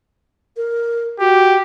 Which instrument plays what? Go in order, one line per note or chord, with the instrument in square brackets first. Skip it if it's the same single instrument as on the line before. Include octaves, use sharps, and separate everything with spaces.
[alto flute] A#4
[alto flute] F#4 [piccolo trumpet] G4